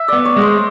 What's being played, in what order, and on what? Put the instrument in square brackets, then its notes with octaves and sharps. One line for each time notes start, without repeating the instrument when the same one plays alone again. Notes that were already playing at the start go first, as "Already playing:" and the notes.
Already playing: [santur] E5
[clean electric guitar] B3 [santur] D5
[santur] C#5
[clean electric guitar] G#3
[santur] C5